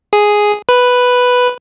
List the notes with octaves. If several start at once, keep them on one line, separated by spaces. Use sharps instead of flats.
G#4
B4